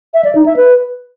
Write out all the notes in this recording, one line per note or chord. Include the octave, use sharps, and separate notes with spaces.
E5
D5
D#4
E5
B4